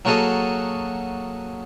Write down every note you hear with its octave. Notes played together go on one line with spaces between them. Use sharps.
F#3 A#3 F#4 G#4 A4 D#5